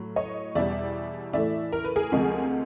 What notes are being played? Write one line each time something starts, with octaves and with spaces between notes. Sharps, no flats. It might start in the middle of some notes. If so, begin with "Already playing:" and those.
Already playing: A2 F#3
C#5 D#5
E2 B2 G3 D5 E5
A2 E3 A3 D5 E5
A#4
B4
G#4 A#4
D2 C3 F3 G#3